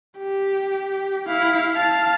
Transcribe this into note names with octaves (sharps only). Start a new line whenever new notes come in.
G4
E4 F5
F5 A5